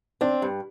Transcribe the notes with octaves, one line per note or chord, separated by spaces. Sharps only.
C4 D4
G2